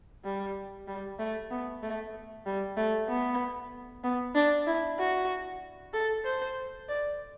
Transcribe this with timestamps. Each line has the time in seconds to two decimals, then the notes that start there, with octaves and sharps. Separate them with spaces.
0.24 G3
0.87 G3
1.19 A3
1.51 B3
1.82 A3
2.46 G3
2.77 A3
3.08 B3
4.04 B3
4.35 D4
4.66 E4
4.98 F#4
5.93 A4
6.25 C5
6.89 D5